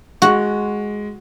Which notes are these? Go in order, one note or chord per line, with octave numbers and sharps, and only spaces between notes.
G#3 F#4